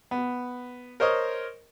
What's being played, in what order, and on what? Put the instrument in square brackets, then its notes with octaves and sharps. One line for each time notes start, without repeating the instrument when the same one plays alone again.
[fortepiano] B3
A#4 C5 C#5 D#5